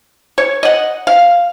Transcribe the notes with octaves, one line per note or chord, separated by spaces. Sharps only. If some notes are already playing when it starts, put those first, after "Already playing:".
C#5
D#5 F#5
F5